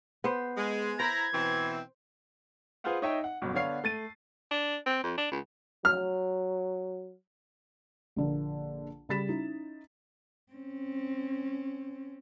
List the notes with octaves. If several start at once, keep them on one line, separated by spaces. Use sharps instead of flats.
B3 C5
G#3
E4 C5 A#5 B5 G#6
B2 E3 C4
F4 G#4 B4 C5 F5 F#5
D#4 C#5 D#5 E5 G5
F#5
G1 F#2 B2
D3 B3 D4 C#5 F5 C7
A3 A6 D#7
D4
C4
F2
D4
C#2
F#3 F6
A#1 D3 A#3
C#3 G3 B5 A6 B6 E7
C#4 D#4 E4
C4 C#4